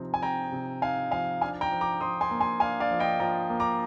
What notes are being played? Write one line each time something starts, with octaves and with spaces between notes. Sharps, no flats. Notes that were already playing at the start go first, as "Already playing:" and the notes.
Already playing: C3 F3 C4 D#4
G#5
C4 G5 A#5
C3
D#4 F5 G#5
F3 F5 G#5
D4 F5 G#5
G5 A#5
F3
A#5 D6
F3 C6 D#6
G#5 C6
A#3
G#5 C6
D4 F5 G#5
D5 F5
F3
D#5 G5
F3 G5 A#5
A#3
A#5 D6